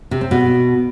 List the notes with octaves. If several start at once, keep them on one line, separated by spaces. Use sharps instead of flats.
C3
C4
B2